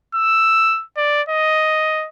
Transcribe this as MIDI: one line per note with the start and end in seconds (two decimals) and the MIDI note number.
0.15 0.84 88
0.97 1.22 74
1.29 2.08 75